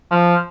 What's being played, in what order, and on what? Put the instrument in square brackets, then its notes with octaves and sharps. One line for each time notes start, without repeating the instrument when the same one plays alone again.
[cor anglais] F3